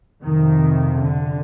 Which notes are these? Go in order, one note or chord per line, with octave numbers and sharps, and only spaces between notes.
F2 C3 D#3
D3